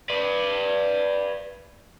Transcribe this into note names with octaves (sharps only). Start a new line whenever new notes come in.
B4 D5